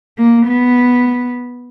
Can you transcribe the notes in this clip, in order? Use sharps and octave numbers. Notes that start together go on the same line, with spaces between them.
A#3
B3